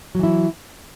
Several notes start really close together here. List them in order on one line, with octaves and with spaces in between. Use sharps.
F#3 E3 E4